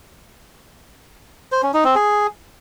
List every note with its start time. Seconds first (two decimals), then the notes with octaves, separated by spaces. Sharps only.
1.52 C5
1.63 C#4
1.74 D#4
1.84 C4
1.95 G#4